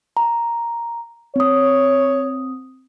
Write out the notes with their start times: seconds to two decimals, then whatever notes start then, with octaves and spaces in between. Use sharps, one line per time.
0.17 A#5
1.36 C4 C#5 D#6